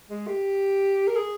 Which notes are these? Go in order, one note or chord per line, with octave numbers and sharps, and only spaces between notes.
G#3
G4
A#4
G#4